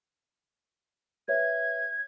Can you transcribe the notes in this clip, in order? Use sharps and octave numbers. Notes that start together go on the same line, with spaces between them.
B4 C#5 E5 G#6